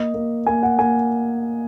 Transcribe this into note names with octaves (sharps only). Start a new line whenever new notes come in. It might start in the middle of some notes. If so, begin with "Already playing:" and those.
Already playing: A#3 D#5
A#3
A#3 G#5
F#5
A#3 G#5